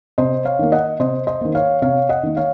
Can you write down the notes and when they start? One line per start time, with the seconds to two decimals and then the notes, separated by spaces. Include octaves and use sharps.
0.18 C3 C5 D#5
0.45 C#5 F5
0.59 D#3 A#3
0.72 D#5 F#5
0.99 C3 C5 D#5
1.27 C5 D#5
1.41 D#3 A#3
1.55 C#5 F5
1.82 C3 C#5 F5
2.09 D#5 F#5
2.23 D#3 A#3
2.37 C#5 F5